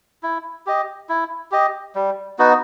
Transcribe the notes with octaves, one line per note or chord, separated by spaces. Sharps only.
E4
G4 D#5
E4
G4 D#5
G3
B3 D#4 F#4